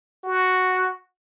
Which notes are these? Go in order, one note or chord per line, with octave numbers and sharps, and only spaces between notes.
F#4